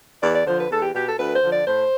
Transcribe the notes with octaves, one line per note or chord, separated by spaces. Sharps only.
E2 D5
D5
D3 F3 C5
B4
E2 A4
G4
B2 G4
A4
D2 B4
C5
D3 F3
D5
A2 C5